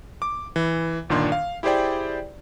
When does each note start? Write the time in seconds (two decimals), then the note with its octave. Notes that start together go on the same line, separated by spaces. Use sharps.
0.22 D6
0.56 E3
1.10 G1 A#2 D#3 D4 C6
1.32 F5
1.63 E4 G4 G#4 C5 D5 G5